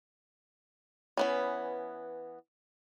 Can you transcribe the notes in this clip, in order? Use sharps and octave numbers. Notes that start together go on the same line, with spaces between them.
E3 B3 C#4